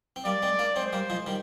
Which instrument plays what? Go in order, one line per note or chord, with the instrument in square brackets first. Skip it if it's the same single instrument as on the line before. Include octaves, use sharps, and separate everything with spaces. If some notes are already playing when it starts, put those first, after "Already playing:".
[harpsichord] C4
[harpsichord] G3 A#3 [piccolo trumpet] D5
[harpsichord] G#3 C4
A#3 D4
[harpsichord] G#3 C4 [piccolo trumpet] C5
[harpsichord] G3 A#3
F3 G#3
D#3 G3